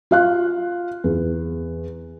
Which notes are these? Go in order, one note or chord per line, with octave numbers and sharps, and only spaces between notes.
F4 F5 F#6
E2